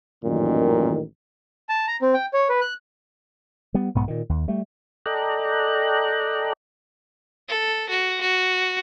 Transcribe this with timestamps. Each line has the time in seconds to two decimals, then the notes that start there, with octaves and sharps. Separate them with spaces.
0.25 A1 F#2 A#2 D#3
1.69 A5
1.87 A#5
2.02 C4
2.14 G5
2.33 C#5
2.49 B4
2.61 F#6
3.74 G3 B3
3.95 B1 G#2 B3
4.08 A#2 D#3
4.29 D#2
4.48 G3 A3
5.06 A4 D5 D#5 G5 A#5 F#6
7.49 A4
7.90 F#4
8.21 F#4